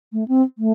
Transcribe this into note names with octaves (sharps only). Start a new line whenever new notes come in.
A3
C4
A3